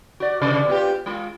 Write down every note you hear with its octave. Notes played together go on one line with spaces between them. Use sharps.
F#4 D5
G2 C3 D5
B3 F4 G4
G#3 F4